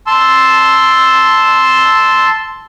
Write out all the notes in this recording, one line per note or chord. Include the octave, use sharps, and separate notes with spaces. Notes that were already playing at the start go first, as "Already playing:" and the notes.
A5 C6 E6